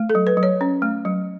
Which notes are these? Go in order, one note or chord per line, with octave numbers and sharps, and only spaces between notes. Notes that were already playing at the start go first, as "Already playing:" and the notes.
Already playing: A3
A4
F#3
B4
F#3
C#5
C#4
A3
F#3